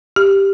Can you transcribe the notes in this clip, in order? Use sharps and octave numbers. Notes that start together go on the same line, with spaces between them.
G4